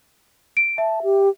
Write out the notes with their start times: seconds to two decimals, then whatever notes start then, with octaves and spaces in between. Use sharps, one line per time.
0.57 D7
0.78 E5 A5
1.03 G4